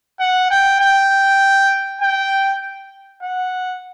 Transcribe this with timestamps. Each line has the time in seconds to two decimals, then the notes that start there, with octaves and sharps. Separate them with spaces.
0.20 F#5
0.50 G5
0.80 G5
2.01 G5
3.23 F#5